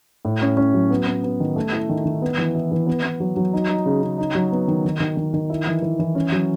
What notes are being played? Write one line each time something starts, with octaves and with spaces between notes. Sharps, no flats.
A2
C#4
C#4
F#3
B3
B3
B3
D#3
A3
E4
D#3
D#3
B3
E3
E4
E3
B3
B3
F#3
F#3
D#4
D#4
C#3
C#3
D#4
F#3
B3
D#3
D#3
D#3
D#3
D#3
E4
E3
E3
E3
C#4
F#3